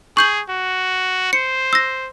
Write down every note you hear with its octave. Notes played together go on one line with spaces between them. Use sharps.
G#4 C#6 G6 F#7
F#4
C5 C#7
E6 A#6